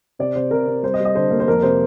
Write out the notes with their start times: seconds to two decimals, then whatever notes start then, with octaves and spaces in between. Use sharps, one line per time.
0.19 C3 D5
0.35 C3 C5
0.51 C3 A#4
0.67 C3
0.83 G3 C5
0.94 D#5
1.00 G3
1.05 D#5
1.15 D3 C5
1.31 A#3
1.40 C5
1.48 F2 A#4
1.63 C3 C5